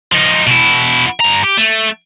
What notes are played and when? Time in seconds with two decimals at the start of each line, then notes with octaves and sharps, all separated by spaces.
0.12 F3 D#4
0.47 B2 E4
1.20 G2 A#5
1.44 G4
1.57 A3